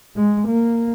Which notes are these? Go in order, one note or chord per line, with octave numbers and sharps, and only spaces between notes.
G#3
A#3